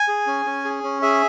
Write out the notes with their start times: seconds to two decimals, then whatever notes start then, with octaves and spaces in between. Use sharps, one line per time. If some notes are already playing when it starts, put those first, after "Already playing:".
Already playing: G#5
0.08 G#4
0.27 C#4
0.46 C#4
0.64 G#4
0.84 C#4
1.02 G#4 E5